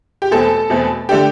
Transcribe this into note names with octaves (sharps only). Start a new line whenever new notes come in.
G4
E2 B2 A3 C4 A4
E2 B2 A3 C4
D3 A3 D4 G4